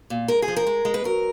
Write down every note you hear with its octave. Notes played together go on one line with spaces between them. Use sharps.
A#2
G#3 A#4
G#4
F3
A#4
G#3
G#3
B4
F#3 A#4